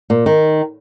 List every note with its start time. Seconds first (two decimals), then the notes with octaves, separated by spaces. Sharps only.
0.10 A#2
0.26 D#3